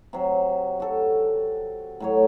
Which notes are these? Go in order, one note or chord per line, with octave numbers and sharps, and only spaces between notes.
C3 F#3
F#4 A4
A2 F#3 C#5